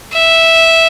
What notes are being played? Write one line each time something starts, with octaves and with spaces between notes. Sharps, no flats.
E5